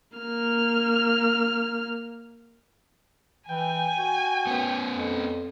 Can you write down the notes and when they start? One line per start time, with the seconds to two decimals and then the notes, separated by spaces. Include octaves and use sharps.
0.18 A#3 F6
3.49 E3 G5 G#5
3.98 F#4
4.47 B3 C#4
4.93 F2